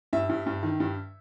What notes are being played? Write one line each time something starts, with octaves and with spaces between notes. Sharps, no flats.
G2 E5
G2
G2
D#3
G2